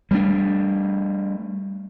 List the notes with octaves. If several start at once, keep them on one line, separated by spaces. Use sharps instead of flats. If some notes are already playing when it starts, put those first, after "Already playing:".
G3 A3 A#3 D4